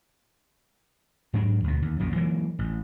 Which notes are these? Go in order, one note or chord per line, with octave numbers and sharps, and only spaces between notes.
G#2 F#3 D4
D2 B2
D#2
A#1 F#2 A#2
E3 F#3 G#3 A#3
A1